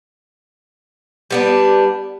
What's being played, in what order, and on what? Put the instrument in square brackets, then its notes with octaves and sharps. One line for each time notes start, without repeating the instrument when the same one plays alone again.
[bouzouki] G3 B3 D4